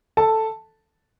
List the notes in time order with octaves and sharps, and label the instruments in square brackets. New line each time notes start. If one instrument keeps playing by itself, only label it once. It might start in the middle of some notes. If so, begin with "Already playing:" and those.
[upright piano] A4 A5